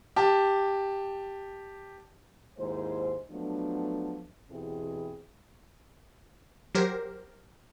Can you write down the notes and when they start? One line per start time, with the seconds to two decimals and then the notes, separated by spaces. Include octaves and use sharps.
0.16 G4 A5
2.58 D#2 G#2 E4 C5
3.30 F3 F#3 A3 B3 D4
4.50 E2 B2 C4 E4 G4 G#4
6.75 F#3 G4 A#4 C5